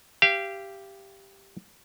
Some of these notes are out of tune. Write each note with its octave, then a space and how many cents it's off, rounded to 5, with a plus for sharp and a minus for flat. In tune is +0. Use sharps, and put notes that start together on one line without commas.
G4 +0 F5 -35